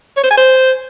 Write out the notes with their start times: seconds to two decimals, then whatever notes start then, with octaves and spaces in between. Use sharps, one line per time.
0.17 C#5
0.24 C5
0.31 G#5
0.37 C5